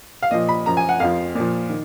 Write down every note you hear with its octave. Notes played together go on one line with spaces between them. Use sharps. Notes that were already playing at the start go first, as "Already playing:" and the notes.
F5
A#2 F3 D#5
B5
F#2 F3 A#5
G#5
F#5
F2 F3 F5
A#2 F3
D#3